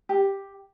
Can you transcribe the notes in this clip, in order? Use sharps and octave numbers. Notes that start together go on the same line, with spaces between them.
G4